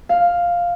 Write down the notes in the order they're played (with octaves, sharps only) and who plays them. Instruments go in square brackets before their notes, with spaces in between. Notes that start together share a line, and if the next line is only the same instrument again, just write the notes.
[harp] F5